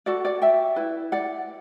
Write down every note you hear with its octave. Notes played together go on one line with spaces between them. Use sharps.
F#4 A4 D5 F#5
D5 F#5
E5 G5
E4 B4
D5 F#5